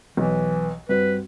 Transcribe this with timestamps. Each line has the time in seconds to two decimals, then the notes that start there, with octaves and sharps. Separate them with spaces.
0.17 B1 E3
0.89 G2 C4 F#4 B4